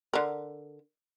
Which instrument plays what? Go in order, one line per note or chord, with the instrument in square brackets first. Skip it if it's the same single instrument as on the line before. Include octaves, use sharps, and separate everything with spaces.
[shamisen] D3 A#4